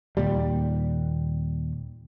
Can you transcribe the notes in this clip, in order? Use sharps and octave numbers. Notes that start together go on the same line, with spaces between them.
D#2 A#2 G3